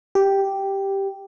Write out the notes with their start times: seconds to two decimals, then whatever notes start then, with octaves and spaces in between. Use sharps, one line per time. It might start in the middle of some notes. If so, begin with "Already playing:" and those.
0.15 G4